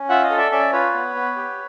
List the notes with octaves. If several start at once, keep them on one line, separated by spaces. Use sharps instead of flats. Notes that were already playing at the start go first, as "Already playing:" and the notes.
Already playing: C#4
F4 E5 F#5
D#5 F5
A4
D5 E5
C#4 D5 E5
F4 B4 C#5
B3
B3
G4